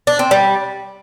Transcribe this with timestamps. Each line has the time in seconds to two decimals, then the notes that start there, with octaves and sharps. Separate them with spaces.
0.07 D4
0.19 C4
0.31 G3